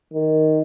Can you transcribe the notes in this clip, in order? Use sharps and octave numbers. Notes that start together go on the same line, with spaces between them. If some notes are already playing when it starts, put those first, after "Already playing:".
D#3